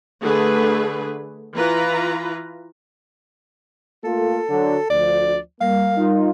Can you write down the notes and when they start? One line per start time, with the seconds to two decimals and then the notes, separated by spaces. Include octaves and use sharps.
0.22 D3 A3 G#4 B4
1.54 E3 F4 B4 A#5
4.04 A3 A#3 F4 A4
4.49 D3 F#3
4.90 D2 F3 D5
5.61 G3 A#3 A#4 F5
5.97 D#4 F4